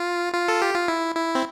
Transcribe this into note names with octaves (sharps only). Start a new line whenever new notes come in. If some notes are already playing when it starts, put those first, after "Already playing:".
Already playing: F4
F4
A4
G4
F4
E4
E4
C4